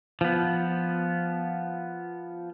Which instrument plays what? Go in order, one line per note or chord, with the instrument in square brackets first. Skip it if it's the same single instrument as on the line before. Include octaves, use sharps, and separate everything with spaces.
[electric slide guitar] F3 B3